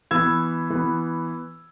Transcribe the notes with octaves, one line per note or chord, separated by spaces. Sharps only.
E3 B3 E6 G#6
E3 B3